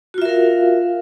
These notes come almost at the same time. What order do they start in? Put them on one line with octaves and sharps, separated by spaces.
F#4 F4 E5 A#4 F5